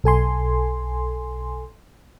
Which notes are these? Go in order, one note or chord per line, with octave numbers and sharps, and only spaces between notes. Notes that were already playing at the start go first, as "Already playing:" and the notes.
B1 A4 G#5 C6